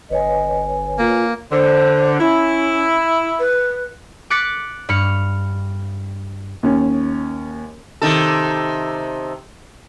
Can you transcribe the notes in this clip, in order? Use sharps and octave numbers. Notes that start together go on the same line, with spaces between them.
G1 B4 C#5 D#5 G#5
A#3 F4
D3 C5
C#4 E4
B4
D6 F#6 A6 B6 C#7
G2 B5 F6 C#7
D#2 C#4
C3 D#3 A4